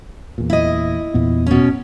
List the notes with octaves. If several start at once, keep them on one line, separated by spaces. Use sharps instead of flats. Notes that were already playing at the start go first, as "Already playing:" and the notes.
E2 A#2
E4 D#5
E2 A#2 B3
B2 C#4